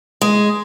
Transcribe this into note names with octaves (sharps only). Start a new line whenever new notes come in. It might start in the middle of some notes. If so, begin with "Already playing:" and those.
G#3